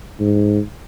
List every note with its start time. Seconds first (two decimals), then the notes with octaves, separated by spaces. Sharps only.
0.20 G#2